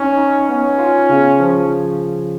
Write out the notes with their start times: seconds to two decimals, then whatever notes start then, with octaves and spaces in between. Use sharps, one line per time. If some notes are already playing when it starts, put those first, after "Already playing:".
Already playing: C#4 D#4
0.17 D#4
0.48 B3 C#4
0.78 F4
1.09 C#3
1.40 F3